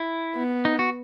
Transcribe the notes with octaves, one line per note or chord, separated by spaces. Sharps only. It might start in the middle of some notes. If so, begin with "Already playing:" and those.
Already playing: E4
B3
D#4
F#4